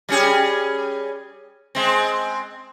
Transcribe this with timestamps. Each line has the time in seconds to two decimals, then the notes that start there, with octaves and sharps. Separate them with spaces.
0.09 G3 C#4 G#4
1.75 G#3 C4